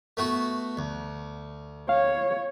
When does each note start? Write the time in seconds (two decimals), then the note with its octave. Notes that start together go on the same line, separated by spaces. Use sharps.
0.17 A3 B3 F#4
0.77 D2
1.89 C#5 F5